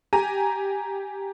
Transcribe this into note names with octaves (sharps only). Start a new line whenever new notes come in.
G4 G#5 A#5